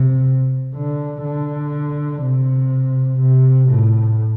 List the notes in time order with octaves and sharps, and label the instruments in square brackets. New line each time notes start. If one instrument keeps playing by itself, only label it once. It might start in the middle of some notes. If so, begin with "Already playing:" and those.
Already playing: [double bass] C3
D3
D3
C3
C3
A2